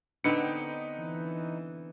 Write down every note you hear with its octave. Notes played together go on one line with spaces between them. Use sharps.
D3 B3 C4 D#4 B4 C#7
E3